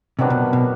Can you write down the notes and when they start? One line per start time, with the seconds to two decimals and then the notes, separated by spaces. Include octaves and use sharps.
0.19 C3 D#3 F#3 B3 D4
0.30 B2
0.53 B2